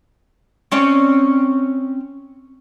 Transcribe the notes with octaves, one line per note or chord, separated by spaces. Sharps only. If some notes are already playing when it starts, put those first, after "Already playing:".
C4 C#4 D5